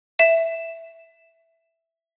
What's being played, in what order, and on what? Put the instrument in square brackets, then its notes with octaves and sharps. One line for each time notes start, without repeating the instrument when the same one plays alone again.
[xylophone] E5 E7